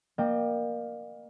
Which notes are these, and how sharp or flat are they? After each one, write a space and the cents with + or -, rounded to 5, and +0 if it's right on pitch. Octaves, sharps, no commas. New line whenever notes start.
A#3 +10 D#5 -45 G5 +10